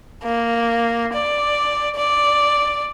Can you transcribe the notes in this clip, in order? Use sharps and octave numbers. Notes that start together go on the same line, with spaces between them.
A#3
D5
D5